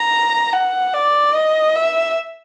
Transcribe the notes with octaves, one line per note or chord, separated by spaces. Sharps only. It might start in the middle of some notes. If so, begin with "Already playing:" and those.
Already playing: A#5
F#5
D5
D#5
E5